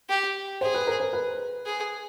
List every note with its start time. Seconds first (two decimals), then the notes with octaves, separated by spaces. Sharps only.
0.09 G4
0.61 G#4 C5
0.74 B4
0.87 A#4
1.00 C5
1.13 B4
1.66 G#4